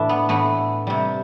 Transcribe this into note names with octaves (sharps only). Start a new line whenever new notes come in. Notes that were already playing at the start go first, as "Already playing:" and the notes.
Already playing: A2 E3 A3 D4 E4
B3
A2 E3 A3 B3
C3 G3